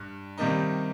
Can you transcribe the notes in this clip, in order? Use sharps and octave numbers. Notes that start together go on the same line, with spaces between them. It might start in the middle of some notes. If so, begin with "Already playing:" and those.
Already playing: G2
C3 D#3 G3 A#3 D#4